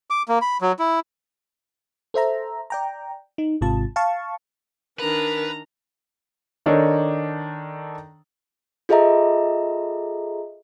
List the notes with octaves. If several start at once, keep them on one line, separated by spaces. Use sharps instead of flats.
D6
A#3
B5
F#3
E4
A4 C5 E5 A#5
D5 G5 A#5
D#4
G#1 G#2 C3 F4 A5
F5 A5 C#6
D#3 D4 A#4 B4 A#5
D#3 D4 D#4 A4 C#5
F4 G#4 A4 D#5 E5 A#5